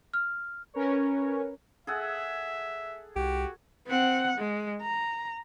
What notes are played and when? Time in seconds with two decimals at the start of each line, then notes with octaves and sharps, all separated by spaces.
0.14 F6
0.74 C#4 A#4 B4 C#5
1.87 G#4 A4 E5 F#5
3.16 C2 F#4 G4
3.87 C4 F#5
4.38 G#3
4.81 A#5